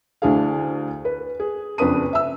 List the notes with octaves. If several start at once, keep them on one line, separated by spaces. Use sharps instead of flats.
D2 D4 E4 G#4 F5
B4
G#4
F#1 F2 D4 B4 D#6 D#7
E5 E6